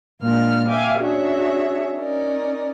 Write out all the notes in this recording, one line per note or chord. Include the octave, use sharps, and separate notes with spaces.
A#2 G#3 A#3 D4 F4 F6
E5 F5 G5 G#5 D6
C#4 D4 F#4 G#4 C#5 E5
C#4 D#4 A#4 D5